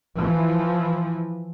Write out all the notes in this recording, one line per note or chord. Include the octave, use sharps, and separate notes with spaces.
E3 F3